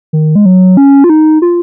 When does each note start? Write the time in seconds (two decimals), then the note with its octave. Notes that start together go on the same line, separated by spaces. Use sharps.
0.13 D#3
0.35 G#3
0.45 F#3
0.77 C#4
1.04 F4
1.10 D#4
1.42 F4